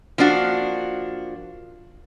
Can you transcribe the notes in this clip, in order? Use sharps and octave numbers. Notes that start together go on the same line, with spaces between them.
F3 A#3 D4 F#4